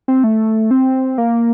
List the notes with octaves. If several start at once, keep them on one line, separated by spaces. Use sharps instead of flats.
C4
A3
C4
A#3